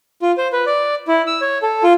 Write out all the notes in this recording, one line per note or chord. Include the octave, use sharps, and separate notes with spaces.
F4
C5
B4
D5
E4
E6
C#5
A4
F4